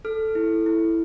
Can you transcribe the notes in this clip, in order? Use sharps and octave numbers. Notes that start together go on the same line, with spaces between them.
A4 F6
E4
E4